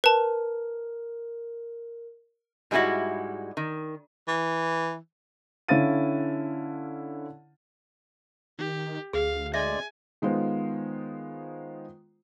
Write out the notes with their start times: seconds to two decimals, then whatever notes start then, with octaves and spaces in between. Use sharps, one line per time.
0.04 A#4 B4 A5
2.71 G#2 G3 G#3 C4 E4 F#4
3.57 D#3
4.28 E3
5.68 D3 C#4 E4 F5 A6 D#7
8.58 D#3 G4
9.13 D2 G#4 F5
9.54 G#3 D5 E5 G#5
10.22 D#3 G#3 B3 F4 C5